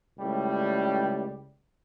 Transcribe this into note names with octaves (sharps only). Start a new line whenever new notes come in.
C#2 A2 G3